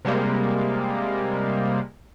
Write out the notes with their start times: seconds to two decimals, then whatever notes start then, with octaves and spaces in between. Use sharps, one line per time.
0.05 C3 G3 G#3 A#3